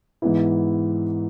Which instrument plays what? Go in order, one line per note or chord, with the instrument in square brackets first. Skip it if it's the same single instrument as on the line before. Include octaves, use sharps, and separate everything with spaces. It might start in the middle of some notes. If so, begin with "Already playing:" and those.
[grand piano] G#2 E3 B3 E4